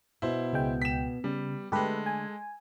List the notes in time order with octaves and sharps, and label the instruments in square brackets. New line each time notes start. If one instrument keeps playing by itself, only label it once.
[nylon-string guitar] B2 [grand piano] E4 C5
[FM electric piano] C#2 G#3 G5
[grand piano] B6 E7
[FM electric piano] C#3 [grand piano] G3
[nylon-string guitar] D3 A3 [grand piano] G#3 A4 [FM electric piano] G4 B4
[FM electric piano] G#5